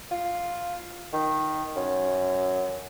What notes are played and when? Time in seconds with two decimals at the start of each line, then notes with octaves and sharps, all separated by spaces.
0.11 F4
1.13 D#3
1.76 F#2